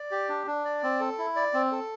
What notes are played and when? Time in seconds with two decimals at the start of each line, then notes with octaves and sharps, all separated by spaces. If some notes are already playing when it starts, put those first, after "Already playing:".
Already playing: D5
0.11 G4
0.29 D4
0.47 D4
0.65 D5
0.83 C4
1.00 A4
1.18 E4
1.36 D5
1.53 C4
1.72 A4